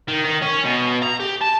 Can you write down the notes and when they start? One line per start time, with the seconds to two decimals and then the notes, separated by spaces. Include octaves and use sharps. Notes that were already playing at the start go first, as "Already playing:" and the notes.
0.08 D#3
0.25 D#3
0.42 C#4
0.65 B2
1.03 A#5
1.20 G4
1.42 A5